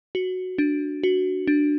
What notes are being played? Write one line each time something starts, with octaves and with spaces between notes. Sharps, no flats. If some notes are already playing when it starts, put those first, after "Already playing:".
F#4
D4
F#4
D4